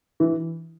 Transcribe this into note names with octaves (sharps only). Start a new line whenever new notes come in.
E3